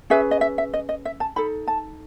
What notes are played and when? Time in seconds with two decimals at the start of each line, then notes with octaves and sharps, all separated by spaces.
0.10 C#4 G#4 B4 E5
0.31 D#5
0.41 E5
0.58 E5
0.74 D#5
0.89 D#5
1.05 E5
1.20 A5
1.36 D#4 A4 B5
1.68 A5